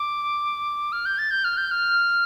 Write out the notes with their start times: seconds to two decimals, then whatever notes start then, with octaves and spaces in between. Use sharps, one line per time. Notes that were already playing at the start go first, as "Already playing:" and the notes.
Already playing: D6
0.92 F6
1.06 G6
1.18 A6
1.31 G6
1.44 F6
1.57 G6
1.71 F6